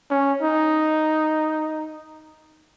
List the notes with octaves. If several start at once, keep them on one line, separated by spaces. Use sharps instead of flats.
C#4
D#4